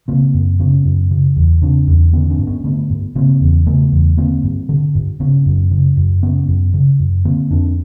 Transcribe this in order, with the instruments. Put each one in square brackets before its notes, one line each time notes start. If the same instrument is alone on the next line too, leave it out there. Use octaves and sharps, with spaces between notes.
[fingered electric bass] C#3 A#3 C4
F#2
C#3 B3 C#4
F#2
C#3
E2
C#3 C4 D4
E2
D3 B3 C#4
C4 D4
G2
B3 C#4
D3 A3 B3
G2
C#3 A#3 C4
E2
C#3 A3 B3
E2
D3 A#3 C4
G2
D3
G2
C#3 B3 C#4
F#2
C#3
F#2
C#3 B3 C#4
F#2
C#3
F#2
D3 A#3 C4
F2 C4 D4